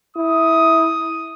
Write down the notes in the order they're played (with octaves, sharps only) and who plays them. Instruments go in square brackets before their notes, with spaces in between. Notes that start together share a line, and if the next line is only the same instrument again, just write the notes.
[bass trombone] E4 [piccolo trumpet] D#6